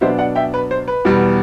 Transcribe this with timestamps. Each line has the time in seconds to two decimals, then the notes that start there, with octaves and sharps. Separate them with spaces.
0.01 B2 F#3 B3 D4 C5 E5
0.19 D5 F#5
0.35 E5 G5
0.54 B4
0.71 C5
0.88 B4
1.05 E2 B2 G3